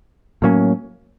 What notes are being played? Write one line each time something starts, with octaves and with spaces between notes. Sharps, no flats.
A2 F#3 A#3 C#4